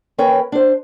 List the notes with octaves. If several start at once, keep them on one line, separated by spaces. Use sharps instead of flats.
D#2 C#4 A#4 B4 G5
D4 C5